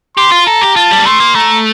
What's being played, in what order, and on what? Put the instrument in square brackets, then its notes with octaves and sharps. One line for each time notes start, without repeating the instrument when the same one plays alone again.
[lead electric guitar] G4 [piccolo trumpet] C6
[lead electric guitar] F4
[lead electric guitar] A4 [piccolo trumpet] A#5
[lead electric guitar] G4
[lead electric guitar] F4 [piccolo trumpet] A5
[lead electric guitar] G3
A#3
[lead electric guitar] A3 [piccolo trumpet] C6
[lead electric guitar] A#3
[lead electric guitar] A3 [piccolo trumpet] A#5